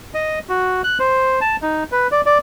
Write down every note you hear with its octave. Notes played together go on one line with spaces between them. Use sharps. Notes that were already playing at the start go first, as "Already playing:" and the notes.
D#5
F#4
F#6
C5
A5
D#4
B4
D5
D5